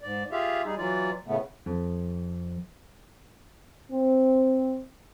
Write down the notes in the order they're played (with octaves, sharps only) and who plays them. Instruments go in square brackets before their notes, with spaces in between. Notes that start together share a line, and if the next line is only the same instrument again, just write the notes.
[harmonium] G#2 D5
F4 G4 G#4 E5 F5
G3 D#4 G#4
E3 F#3 F4 D5
A2 C#3 A3 B3
[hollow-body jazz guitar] F2
[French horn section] C4